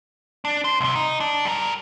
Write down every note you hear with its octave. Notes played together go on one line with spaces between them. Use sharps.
D4
C5
C2 C3
D#4
D4
G3 A#4